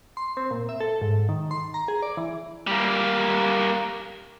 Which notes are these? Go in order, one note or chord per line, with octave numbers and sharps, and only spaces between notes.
C6
C4
A#2
E5
A4
G#2
D#3
C6
A#5
G#4
D5
E3
G3 A#3